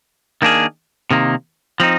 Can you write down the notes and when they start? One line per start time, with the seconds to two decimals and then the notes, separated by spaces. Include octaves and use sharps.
0.42 D#3 A#3 D4 G#4
1.11 C3 D#3 A#3
1.80 F3 C4 D#4